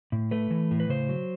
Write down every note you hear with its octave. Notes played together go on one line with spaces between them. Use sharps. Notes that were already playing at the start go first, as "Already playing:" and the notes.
A2
A3 B4
E3
A2
B4
C#3 C5
F#3